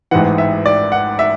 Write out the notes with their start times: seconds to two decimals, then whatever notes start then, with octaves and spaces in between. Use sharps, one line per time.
0.11 A1 G#2 E3 F#5
0.38 E5
0.66 D5
0.92 F#5
1.19 E5